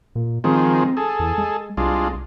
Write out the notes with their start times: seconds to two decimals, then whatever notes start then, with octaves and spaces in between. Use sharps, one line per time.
0.15 A#2
0.44 D#3 F3 G#3 C4
0.97 G#4 A4
1.20 E2
1.38 G#3
1.77 C2 G#3 D4 F4